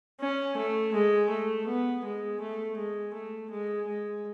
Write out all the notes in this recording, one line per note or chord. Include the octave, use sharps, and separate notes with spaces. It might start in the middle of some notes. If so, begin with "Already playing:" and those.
C#4
A3
G#3
A3
B3
G#3
A3
G#3
A3
G#3
G#3